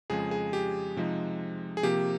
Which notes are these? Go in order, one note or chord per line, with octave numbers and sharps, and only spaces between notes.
F2 C#3 F3 G#3 G#4
G#4
G4
C3 F3 G#3 D#4
G#4
C3 F3 A#3 G4